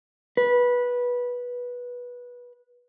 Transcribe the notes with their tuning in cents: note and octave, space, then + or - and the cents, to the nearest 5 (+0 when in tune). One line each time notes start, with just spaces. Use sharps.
B4 -15